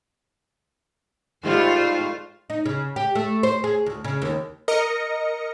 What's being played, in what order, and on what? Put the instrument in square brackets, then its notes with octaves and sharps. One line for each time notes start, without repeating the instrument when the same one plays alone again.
[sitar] G#2 G3 A3 [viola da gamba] F4 C5
[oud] D#4
C#3
G4
A3
C5
G#4
D2
C#3
D#2
[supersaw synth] A#4 D#5 A#6 C#7